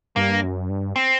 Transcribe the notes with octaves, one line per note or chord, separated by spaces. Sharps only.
G2 A#3
F#2
G2
C4